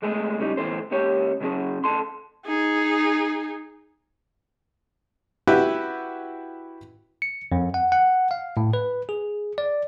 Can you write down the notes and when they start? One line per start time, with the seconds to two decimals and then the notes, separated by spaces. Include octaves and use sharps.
0.02 D2 G#3 A3 G#4
0.40 C#3 G3 D#4
0.57 D2 A2 E3 A4 C5
0.91 C#2 C#3 A#3 G4 C#5
1.41 C#3 F#3 C#4 G#4
1.84 D2 A4 C6
2.45 D#4 G#4
5.47 E4 F#4 G4 B4 E5
7.22 C#7
7.52 F2
7.74 F#5
7.92 F#5
8.31 F5
8.57 A2
8.73 B4
9.09 G#4
9.58 D5